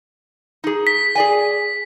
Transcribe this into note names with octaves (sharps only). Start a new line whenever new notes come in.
D#4 G#4
B6
G#4 D5 G#5